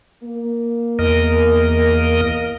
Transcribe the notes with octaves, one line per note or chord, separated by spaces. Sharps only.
A#3
E2 A#4 D#5